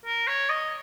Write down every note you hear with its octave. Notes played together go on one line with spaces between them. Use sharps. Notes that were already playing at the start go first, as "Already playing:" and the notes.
A#4
C#5
D#5